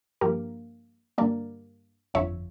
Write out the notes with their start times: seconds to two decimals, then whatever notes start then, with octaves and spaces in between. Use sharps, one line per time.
0.21 G2 F3 A#3 G4 A#4
1.18 G2 D3 G3 A#3 A#4 D5
2.14 G1 F2 D3 F3 C#5 E5